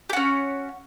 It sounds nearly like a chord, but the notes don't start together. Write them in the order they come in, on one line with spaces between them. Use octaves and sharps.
G4 F#4 C#4